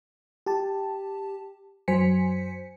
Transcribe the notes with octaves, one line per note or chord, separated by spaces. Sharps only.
G4 A5
F#2 F#3 C5 G#5 B6 C#7